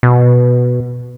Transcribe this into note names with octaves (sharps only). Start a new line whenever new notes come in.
B2